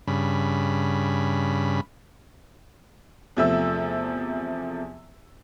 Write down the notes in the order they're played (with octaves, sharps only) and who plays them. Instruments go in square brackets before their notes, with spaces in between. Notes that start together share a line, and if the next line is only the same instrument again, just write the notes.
[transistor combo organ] G2 C#3 B5
[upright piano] E2 C3 F3 A3 E5 E6